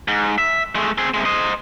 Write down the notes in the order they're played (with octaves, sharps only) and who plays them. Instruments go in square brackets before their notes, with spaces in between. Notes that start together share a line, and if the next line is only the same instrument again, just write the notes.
[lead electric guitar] G#2
E5
G#3 A3
C4 G#4
C3 G#3
C5 D#5